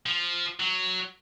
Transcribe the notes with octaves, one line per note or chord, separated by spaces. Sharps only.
F3
F#3